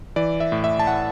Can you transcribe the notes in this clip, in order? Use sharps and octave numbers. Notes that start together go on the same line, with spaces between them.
E3 D5
E5
A2
E5
A5
A2 F#5